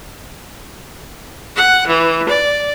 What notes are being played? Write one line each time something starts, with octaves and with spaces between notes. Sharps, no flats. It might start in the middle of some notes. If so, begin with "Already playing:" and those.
F#5
E3
D5